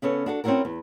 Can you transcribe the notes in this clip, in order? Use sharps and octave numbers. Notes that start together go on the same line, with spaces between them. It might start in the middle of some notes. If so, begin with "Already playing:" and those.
C#3 B3 C#4 A4
D4 F#4 A4
C4 C#4 D#4 E4 F#4 A#4
E2